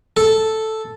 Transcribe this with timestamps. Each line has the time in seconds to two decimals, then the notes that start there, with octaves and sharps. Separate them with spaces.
0.17 A4